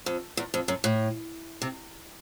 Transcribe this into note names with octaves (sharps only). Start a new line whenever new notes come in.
F2
E2
F2
F#2
A2
C3